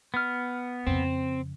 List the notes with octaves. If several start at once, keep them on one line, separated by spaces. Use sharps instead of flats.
B3 F6
F2 C#3 C4